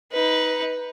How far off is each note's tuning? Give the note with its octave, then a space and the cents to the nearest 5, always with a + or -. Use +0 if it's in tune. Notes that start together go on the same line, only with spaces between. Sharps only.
D#4 +25 B4 +0